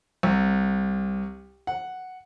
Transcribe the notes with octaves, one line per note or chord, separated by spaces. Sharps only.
C2
F#5